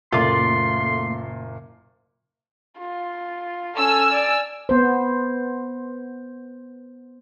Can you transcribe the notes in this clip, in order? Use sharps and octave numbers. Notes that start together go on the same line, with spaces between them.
F#1 A#2 A3 A#3 F4 D5 C6
F4
C#4 A4 G#5 E6 F6
D5
B3 C5